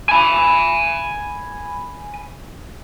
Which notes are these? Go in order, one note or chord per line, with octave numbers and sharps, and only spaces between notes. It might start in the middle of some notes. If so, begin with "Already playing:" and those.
G#5 B5